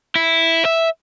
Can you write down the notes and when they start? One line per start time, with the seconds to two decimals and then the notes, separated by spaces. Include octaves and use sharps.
0.15 E4
0.65 E5